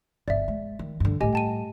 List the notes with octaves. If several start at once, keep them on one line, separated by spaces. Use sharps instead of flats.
G1 G2 D5 E5
G#3
D#3
G2 D3
A2 G3 G4 D#5 G#5
G5 A5 D#7